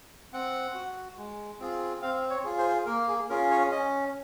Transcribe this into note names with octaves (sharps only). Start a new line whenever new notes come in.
C4 F#5
F#4
G#3
C4 F4 G#4
C4 F5
C#5
F4 G#4
C5
A#3 A#4
G#4
C#4 F4 G#4 A#4
C#5
C#4 D#5